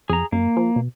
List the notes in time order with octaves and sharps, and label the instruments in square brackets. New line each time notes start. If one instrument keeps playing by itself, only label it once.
[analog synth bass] F2 [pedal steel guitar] G#4 A#5
[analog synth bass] F#2 [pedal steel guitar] A#3
[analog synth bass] F3
B2